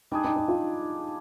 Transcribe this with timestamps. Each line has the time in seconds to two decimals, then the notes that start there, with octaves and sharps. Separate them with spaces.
0.11 G3 D4 D#4 G#4
0.24 D#4
0.36 D#4
0.48 F4